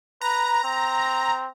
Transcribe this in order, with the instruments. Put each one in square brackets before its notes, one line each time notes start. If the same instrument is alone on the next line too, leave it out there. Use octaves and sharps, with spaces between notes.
[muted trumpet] B4 [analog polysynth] A#5
[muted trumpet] C4